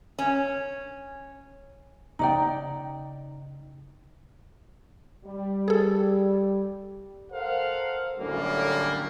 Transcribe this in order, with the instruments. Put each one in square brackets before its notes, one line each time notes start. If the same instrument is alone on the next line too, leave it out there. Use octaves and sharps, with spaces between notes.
[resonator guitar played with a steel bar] C#4
[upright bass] C#3 [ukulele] D#4 D5 G5 [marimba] A#5
[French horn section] G3
[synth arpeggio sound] G#4 A4
[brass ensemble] A4 A#4 C5 F5 F#5
F#2 A2 D3 G3 A#3